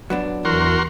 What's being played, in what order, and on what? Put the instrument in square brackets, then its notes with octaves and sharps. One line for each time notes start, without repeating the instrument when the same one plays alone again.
[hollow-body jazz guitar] F#3 B3 D4
[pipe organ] E2 E3 [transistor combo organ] F#4 A#4 C6